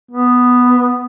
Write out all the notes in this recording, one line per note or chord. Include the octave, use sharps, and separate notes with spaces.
B3